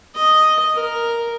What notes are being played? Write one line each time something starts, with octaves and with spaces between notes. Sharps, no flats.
D#5
A#4